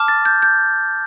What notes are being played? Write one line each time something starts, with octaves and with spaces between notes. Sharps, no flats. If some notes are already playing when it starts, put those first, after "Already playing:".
Already playing: A5 D6 F6
A6
G6
G6